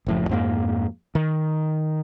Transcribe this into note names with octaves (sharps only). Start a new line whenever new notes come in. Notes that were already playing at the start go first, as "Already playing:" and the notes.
F#1 A2 F3
F2 G#2 A#3
D#3